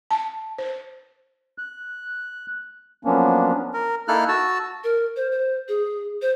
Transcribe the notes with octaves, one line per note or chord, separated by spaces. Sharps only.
A5
C5
F#6
F3 F#3 A#3 B3 C#4 D4
A#4
A#3 D#4 E4 A4 F6 F#6
F#4 A5 E6
A#4
C5
C5
G#4
C5